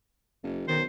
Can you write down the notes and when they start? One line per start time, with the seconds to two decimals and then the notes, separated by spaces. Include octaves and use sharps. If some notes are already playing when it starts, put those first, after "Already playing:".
0.43 F#1
0.68 B1 D#3 C5